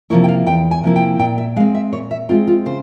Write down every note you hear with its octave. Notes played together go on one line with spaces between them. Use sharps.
C3 F3 A#3 E4 C#5
G5
F5
E2 G5
G#5
C3 F3 A#3 E4
G5
A#2 G5
E5
G#3 C4 F5
E5
A#2 C#5
E5
G#3 C4 F4
F4
C#3 C5